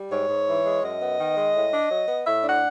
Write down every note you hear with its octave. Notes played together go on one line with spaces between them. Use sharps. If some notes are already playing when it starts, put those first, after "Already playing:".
Already playing: G3
G#2 C#5
G#2
E3
G#3
F#2 D#5
B3
D#3
G#3
A2
D4
F#3
B3
A2 E5
D4
F#5